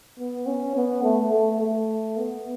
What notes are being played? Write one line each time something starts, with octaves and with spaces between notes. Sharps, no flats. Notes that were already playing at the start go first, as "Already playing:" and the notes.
B3
C#4
B3
A3
A3
A3
B3